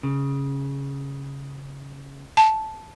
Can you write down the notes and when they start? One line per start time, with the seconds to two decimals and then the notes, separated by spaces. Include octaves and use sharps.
0.03 C#3
2.37 A5